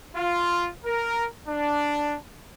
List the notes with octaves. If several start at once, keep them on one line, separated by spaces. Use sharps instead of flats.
F4
A#4
D4